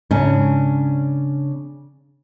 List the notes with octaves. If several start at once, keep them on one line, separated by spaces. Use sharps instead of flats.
G#2 C#3 C#4 D4